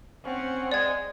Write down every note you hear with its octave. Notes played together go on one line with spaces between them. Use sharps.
C4 C#4 F#5
G#3 D5 G#6